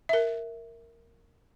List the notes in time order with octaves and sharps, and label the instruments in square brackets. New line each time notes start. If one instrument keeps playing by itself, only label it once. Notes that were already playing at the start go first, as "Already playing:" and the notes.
[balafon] A#4 E5